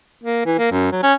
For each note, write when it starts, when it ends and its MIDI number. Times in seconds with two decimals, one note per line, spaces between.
0.24 0.41 58
0.46 0.55 52
0.59 0.69 58
0.72 0.89 42
0.92 1.01 54
1.03 1.13 61